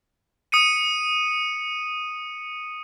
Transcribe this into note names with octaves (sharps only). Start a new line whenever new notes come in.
D#6 C#7 D#7